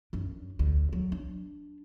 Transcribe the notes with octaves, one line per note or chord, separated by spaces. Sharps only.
F#2 D4
D2
F#3
D4